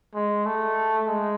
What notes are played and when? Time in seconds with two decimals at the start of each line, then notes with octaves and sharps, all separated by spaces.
0.15 G#3
0.46 A3
1.07 G#3